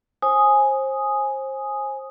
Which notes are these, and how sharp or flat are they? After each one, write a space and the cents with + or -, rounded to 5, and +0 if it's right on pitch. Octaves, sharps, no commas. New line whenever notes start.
C5 +30 G#5 +0 D#6 +0